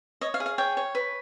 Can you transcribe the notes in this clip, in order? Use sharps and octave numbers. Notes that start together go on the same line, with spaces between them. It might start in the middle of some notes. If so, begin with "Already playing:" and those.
C#5 D#5
F5
G#4
F5
C#5 G5
C#5
B4